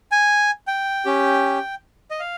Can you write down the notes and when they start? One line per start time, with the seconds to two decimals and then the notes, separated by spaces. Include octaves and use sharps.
0.12 G#5
0.67 G5
1.05 C#4 G4
2.11 D#5
2.20 F5